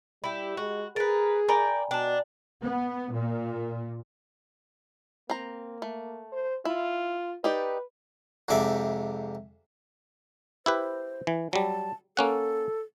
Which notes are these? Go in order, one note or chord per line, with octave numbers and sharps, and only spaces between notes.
G3 E4 G4 B5
G#3 F#4
G#4 A#4 B4 A6
A#4 D5 G5 G#5 A#5 B5
B2 D4 G5 A5
B3
A#2
A#3 C4 A#5
A3
C5
E4 F4
D#4 G4 B4 D5
F2 G#2 C3 D5 E5
E4 G4 B4 C5
E3
F#3 G3 A5
A#3 C#4 A4 F#5